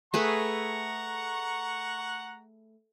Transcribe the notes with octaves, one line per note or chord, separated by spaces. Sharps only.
A3 G#4 B4 F#5 A#5 C#6